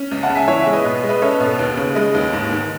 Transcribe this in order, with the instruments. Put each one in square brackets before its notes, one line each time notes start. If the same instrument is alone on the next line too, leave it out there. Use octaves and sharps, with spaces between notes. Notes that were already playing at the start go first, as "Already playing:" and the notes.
Already playing: [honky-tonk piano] C#4
C#2
[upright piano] F#5 A5
[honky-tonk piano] C#3
[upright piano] E5 G#5
[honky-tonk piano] E3 [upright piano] C#5 E5
[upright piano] E5 G#5
[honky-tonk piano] G#3
[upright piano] B4 D#5
[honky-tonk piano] B2 [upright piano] B4
[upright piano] B4
[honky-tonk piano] G#3
[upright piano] B4 D#5
[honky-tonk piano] C#4 [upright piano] A4 C#5
[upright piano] B4
[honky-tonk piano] B2
[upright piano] A4
[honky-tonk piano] D#2 [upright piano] B4
[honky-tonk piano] C#3 [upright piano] B4
[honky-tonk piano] G#3 [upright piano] B4 D#5
[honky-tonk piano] D#2
G#2
D#3